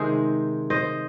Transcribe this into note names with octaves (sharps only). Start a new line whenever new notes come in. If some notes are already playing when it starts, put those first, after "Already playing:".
Already playing: C3 D#3 G#3 G#4 C5
C5 D#5